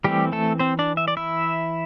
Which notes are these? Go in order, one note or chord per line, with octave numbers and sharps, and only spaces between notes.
E3 G3 A3 C4 G4
A3 A4
C4 C5
D4 D5
E5
D5
E4 E5